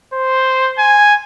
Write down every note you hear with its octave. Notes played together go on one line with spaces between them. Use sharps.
C5
G#5